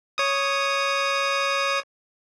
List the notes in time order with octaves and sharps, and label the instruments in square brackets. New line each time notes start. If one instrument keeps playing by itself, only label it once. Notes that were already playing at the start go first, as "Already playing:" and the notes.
[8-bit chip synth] C#5 D#6